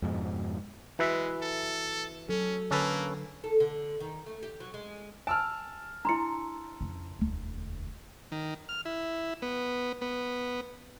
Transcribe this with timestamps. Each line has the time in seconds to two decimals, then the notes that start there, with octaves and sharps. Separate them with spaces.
0.02 F2 G#2 B2
0.99 E3 G#3 F#4 B4 E5
1.42 A4
2.29 F#3 C#4 A4
2.71 D3 A#3 C#4 A4 B4
3.44 A4
3.60 D3
4.00 D#3
4.26 A3
4.43 G4
4.60 F#3
4.74 G#3
5.27 G#5 A5 E6 F6
6.05 D4 E4 A#5 C6 C#7
6.80 F2 C#3
7.19 E1 D2
8.32 D#3
8.69 F6
8.85 E4
9.42 B3
10.01 B3